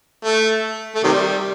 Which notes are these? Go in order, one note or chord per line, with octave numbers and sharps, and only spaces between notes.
A3
A3
C3 D#3 G3